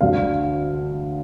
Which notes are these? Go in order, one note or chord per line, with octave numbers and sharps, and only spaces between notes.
D2 D3 F5